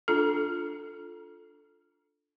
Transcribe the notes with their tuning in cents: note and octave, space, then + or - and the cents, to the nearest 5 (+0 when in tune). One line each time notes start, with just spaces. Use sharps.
D4 +0 F4 +5 A4 +0